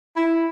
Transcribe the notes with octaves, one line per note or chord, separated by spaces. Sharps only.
E4